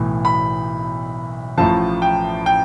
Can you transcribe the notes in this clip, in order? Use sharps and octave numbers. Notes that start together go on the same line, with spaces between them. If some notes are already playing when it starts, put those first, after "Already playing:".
Already playing: B1 A2 E3
B5
A1 A2 F3 A5
G5
G5